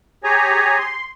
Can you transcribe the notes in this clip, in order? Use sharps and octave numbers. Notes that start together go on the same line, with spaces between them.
G4 G#4 C#5 G#5 A#5
C6